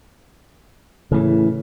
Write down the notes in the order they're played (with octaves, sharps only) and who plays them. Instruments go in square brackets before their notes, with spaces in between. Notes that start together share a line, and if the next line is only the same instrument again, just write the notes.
[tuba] A2 [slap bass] C#3 E3